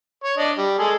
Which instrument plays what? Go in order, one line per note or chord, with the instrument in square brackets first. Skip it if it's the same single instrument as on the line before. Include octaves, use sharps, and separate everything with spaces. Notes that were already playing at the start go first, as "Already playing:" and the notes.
[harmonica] C#5
D4 D5 D#5
G3
G#3 G#4 A4